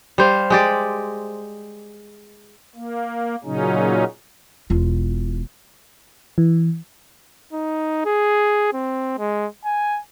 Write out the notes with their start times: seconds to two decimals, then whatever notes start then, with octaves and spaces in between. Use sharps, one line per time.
0.18 G3 C5 F5
0.50 G#3 G4 D5
2.75 A#3
3.44 A#2 C#3 F#3 C#4 D#4
4.70 E1 F4
6.38 E3
7.53 D#4
8.06 G#4
8.73 C4
9.19 G#3
9.65 G#5